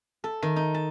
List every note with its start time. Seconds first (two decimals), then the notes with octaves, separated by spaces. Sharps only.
0.24 A4
0.42 D#3
0.56 D#4
0.74 A5